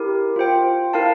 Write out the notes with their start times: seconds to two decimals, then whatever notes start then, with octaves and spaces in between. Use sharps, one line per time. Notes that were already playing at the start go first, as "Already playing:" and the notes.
Already playing: E4 G4 A#4
0.36 F4 C5 G5
0.93 E4 A#4 F5 A5